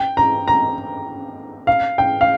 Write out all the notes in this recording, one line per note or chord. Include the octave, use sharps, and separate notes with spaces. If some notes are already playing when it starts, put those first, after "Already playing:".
Already playing: G5
A#5
A#5
F5
G5
F5